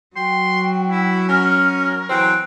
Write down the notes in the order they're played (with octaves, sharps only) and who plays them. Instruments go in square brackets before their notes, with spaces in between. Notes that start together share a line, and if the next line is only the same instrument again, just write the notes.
[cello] F#3 F#4 [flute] G5 [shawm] C6
[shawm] E4
[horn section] C#4 [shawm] A#4 [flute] F6
[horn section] E3 F#3 C4 [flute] F#6